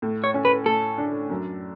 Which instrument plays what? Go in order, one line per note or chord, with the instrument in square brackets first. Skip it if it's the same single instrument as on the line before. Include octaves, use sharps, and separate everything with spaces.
[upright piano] A2
[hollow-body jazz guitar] C#5
[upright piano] C#4
[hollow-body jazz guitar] B4
[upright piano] A2 [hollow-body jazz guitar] A4
[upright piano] D4
F#2